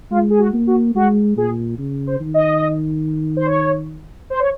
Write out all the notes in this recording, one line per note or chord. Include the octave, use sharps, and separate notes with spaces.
G#3 F4
G#4
F#4
A#3
F#4
G#3 F#4
A#2 G#4
C#3
C5
D#3
D#5
C5
C#5
C5
C#5